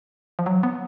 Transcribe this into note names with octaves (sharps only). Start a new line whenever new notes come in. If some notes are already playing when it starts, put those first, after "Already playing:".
F3
F#3
B3